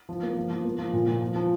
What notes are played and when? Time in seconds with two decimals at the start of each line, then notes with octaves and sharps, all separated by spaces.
0.09 F3
0.23 A#3
0.37 F3
0.50 F3
0.65 A#3
0.78 F3
0.93 A#2
1.07 A#2
1.21 F3
1.36 F3